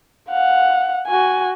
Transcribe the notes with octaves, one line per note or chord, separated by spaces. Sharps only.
F5 F#5
F#4 G#5